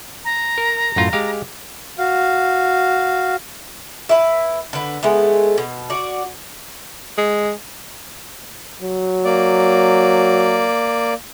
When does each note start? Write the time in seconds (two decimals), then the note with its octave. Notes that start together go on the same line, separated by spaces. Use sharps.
0.25 A#5
0.58 A#4
0.96 F#2 A2 F4
1.13 G#3 G4 F5
1.98 F#4 F5
4.09 E4 B4
4.73 D3 B4
5.03 G#3 A3 B3
5.58 B2
5.90 F#4 D5
7.18 G#3
8.82 F#3
9.25 A#3 D5